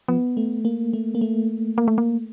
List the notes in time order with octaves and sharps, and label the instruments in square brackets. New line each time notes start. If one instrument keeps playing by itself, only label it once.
[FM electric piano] F3 [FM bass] B3
[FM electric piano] A3
A#3
A3
A#3
A3
[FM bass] A#3
A3
A#3